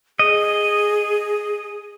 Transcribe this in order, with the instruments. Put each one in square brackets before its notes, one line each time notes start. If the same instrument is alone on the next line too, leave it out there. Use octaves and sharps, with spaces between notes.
[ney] G#4 [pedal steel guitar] D#5